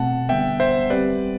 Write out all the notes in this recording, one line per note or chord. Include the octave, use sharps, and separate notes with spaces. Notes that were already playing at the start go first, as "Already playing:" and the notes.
Already playing: B2 A3 C4 F#5 A5
D3 G3 B3 E5 G5
C5 E5
G3 C4 G4 B4 D5